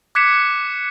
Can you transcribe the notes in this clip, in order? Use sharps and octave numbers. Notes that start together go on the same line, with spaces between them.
D6 F#6 G#6 B6 C#7 E7